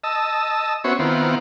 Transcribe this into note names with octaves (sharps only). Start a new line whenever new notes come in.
D#5 A5 E6
B3 C#4 F#4 C5 C#5 E5
D#3 B3 C4 E4 F4